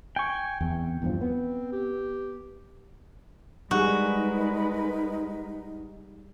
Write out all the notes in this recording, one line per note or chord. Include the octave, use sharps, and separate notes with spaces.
G5 G#5 C#6
E2 C4
E2 G2 F3
B3
G4
G3 G#3 D#4 F#4 G#4 A#4 B4